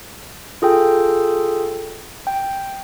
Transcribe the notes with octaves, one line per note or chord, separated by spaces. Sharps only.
F4 G#4 A4 G5
G5